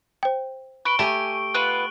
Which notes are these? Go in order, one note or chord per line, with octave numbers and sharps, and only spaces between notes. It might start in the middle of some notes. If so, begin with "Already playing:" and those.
C5 G5
B4 C#6 D7 G7
A3 G4 G#5 A5
B3 F4 B4 F#6 F#7